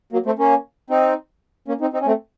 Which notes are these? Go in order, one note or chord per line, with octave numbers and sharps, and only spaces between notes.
F#3 A#3
A3 C4
A#3 C#4
C4 D#4
A#3 C#4
C4 D#4
C4 D#4
C#4
A3 C4